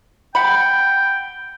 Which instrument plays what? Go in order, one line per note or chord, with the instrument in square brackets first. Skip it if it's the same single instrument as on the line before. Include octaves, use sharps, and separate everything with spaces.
[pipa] F#5 B5 [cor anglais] G5